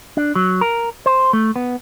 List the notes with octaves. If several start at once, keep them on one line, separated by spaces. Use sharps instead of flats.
D4
F#3
A#4
C5
A3
B3